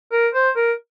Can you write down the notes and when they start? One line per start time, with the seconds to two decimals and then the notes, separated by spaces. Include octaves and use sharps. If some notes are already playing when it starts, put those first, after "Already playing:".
0.12 A#4
0.34 C5
0.57 A#4